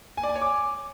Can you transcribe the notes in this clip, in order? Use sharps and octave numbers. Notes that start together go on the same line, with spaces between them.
G#5
D5
G#5
C#5
D6